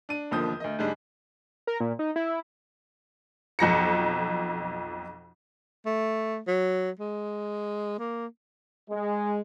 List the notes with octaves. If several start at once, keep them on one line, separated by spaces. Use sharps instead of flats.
D4 D#7
E1 D#2 D3 F3 D#6 G6
D2 D#5
G#2 D3 G3 G#3 D4
A#4
A#2
D#4
E4
B1 F2 A#6 C#7
A3
F#3
G#3
A#3
G#3